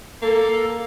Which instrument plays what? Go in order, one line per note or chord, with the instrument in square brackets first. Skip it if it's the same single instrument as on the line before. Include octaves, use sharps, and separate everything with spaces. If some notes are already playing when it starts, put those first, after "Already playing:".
[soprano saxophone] A#3 [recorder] A4